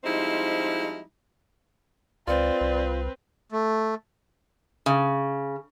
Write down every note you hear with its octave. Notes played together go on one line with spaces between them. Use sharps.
F3 G3 G#3 C4 D#4 E4
C#2 C4 F4 B4 D5
C2
A3
C#3